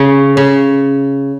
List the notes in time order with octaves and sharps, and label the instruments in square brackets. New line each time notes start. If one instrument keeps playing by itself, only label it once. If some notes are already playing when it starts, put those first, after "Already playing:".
Already playing: [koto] C#3
C#3